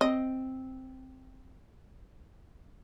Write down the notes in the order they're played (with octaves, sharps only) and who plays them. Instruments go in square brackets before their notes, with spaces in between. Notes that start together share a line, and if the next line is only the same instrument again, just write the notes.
[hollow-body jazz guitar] C4 [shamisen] D#5